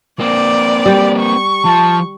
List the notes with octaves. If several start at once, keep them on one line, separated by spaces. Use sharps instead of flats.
A#3 C4 D5
G3 G4
C#6
F3 A5